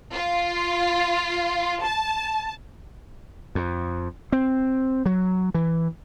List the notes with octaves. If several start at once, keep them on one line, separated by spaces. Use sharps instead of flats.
F4
A5
F2
C4
F#3
E3